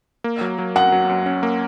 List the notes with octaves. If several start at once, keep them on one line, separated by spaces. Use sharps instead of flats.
A#3
F#3
F#3
F#2 F#5
F#3
F#2
C#4
A#3